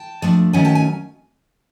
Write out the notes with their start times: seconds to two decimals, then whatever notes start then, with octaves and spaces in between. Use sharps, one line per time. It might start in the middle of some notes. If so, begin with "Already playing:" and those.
Already playing: G5 A5
0.22 F3 A3 D4
0.53 D#3 F#3 A3 C#4 F#5 G#5
0.65 G5 A5
0.75 G#5